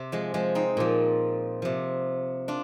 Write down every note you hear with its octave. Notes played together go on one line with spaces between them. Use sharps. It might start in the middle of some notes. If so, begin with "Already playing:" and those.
Already playing: C3
F3 G#3
F3 G#3
C4 D#4
A#2 F3
C3 F3
D4 F4